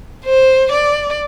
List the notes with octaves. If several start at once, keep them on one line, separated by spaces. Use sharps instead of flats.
C5
D5